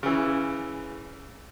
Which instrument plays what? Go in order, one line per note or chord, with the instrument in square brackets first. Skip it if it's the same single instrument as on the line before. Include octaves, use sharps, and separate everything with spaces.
[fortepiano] C#3 E3